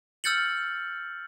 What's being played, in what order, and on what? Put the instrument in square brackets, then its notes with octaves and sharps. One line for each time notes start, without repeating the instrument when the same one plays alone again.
[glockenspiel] E6 F6 G6 A6 C#7 F#7